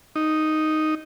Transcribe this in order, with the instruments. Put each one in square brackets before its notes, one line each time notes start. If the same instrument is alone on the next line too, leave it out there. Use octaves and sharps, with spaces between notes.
[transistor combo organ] D#4